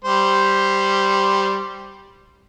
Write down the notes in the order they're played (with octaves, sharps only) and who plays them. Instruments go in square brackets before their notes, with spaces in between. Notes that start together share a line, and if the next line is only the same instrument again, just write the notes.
[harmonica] G3 C5